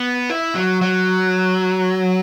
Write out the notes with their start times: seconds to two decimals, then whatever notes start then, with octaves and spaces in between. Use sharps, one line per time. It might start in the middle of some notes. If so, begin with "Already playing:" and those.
Already playing: B3
0.29 E4
0.55 F#3
0.81 F#3